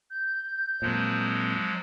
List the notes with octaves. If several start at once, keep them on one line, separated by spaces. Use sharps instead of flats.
G6
F2 A#2 F3 F#3 G#3